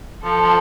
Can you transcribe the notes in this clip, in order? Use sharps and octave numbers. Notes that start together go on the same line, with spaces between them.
F3 A4
F3